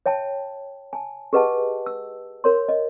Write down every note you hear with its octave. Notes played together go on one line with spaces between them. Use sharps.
C#5 E5 G5 A5
G#5 A5
G4 G#4 B4 D#5 F#5 A5
E6
F#4 A#4 C#5 C6
D#5